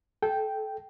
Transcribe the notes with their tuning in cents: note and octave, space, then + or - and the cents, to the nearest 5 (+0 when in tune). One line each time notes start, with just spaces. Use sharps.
A4 -25 G5 +0